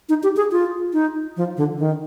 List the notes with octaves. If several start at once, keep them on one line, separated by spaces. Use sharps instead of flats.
D#4
G4
G#4
F4
D#4
F3
D3
D#3